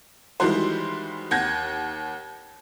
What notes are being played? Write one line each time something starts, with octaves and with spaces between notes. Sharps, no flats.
D#3 E3 G3 G#3 F#4 C5
D#2 F#5 G6 G#6 A#6